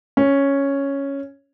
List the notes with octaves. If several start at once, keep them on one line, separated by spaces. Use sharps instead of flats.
C#4